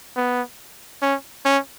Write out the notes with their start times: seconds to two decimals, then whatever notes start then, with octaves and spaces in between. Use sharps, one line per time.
0.16 B3
1.02 C#4
1.45 C#4